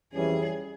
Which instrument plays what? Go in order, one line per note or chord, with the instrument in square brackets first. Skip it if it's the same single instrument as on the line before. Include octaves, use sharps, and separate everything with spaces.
[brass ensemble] F2 E3 G3 C#4 [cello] G#4